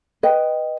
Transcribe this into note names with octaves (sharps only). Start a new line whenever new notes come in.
B4 D#5 G5